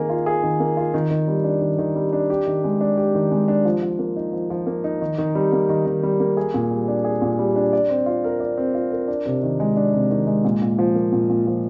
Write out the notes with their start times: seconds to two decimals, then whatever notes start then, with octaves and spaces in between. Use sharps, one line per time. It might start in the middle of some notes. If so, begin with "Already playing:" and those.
Already playing: D#3 A#3 G#4
0.09 F4
0.26 G#4
0.43 D#3
0.60 A#3
0.77 F4
0.94 D#3
1.11 D#3
1.28 G3
1.44 D4
1.61 D#3
1.78 D#3
1.96 G3
2.13 D4
2.30 G4
2.47 D#3
2.64 G#3
2.81 D4
2.97 G4
3.15 D#3
3.32 G#3
3.48 D4
3.65 F3
3.82 F3
3.99 A#3
4.16 D#4
4.33 F3
4.50 F3
4.67 A#3
4.84 D#4
5.01 D#3
5.18 D#3
5.35 G3
5.52 A#3
5.69 D#3
5.86 D#3
6.03 G3
6.20 A#3
6.37 G#4
6.54 A#2
6.71 G3
6.88 D4
7.04 G#4
7.22 A#2
7.39 G3
7.56 D4
7.73 D5
7.89 C4
8.06 F4
8.24 A#4
8.40 D5
8.58 C4
8.75 F4
8.92 A#4
9.08 D4
9.25 C3
9.43 D#3
9.60 G#3
9.77 D4
9.94 C3
10.11 D#3
10.27 G#3
10.44 A#2
10.62 A#2
10.79 F3
10.95 A#3
11.12 A#2
11.29 A#2
11.47 F3